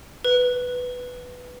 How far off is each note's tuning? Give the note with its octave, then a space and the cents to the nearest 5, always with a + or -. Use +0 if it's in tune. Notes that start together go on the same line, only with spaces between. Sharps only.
B4 +5